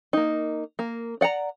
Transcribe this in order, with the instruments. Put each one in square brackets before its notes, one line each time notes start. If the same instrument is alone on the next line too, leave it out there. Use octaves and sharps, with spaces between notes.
[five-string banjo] A#3 D#4
A#3
D5 F#5 G5 A#5